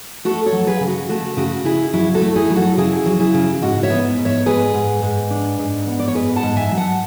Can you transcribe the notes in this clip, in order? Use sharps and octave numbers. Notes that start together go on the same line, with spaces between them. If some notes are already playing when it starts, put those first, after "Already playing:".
A3 F#4 A4
A4 C#5
F#3
G#4 B4
C#3
F#4
A3 F#4
C#3 F#4
C#3 E4 G#4
F#3 E4
F#4 A4
A3
E4 G#4
F#3
F#4 A4
C#3 E4 G#4
F#3
E4 G#4
C#3
G#2 F#4
C#5 E5
B3
G#2
C#5 E5
G#2 G#4 B4
G#2
G#2
D4
G#2
B3
D5
C#5
G#2 G#4 B4
F#5 A5
G#2
E5 G#5
F#3
F#5 A5